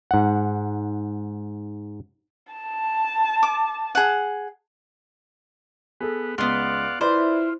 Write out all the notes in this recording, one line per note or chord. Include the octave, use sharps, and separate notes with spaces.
G#2 F#5
A5
D6
G#4 F#5
B3 G#4 A4
C#2 B3 D5 F5 F#5 C6
E4 F4 B4 C5 D5